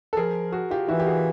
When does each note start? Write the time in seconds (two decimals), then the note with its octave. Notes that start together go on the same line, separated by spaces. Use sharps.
0.13 A4
0.17 F3 G#4 A#4
0.52 F#4 G#4
0.71 F4 G4
0.88 E3 E4 F#4
1.00 G4
1.07 F#4 G#4